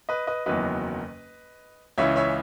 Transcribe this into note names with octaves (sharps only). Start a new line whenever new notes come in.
B4 D#5
B4 D#5
F#1 E2 D#3 F#3 B4 D#5
C#2 C#3 E3 C#5 E5
C#5 E5